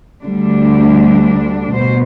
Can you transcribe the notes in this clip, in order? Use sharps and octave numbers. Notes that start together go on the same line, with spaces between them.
D2 D3 G3 D4
B2 C5